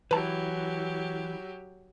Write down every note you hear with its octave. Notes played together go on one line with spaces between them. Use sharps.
E3 F#3 G4 B4 A5